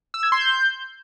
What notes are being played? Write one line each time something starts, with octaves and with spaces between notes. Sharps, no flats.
E6
G#6
C6
G6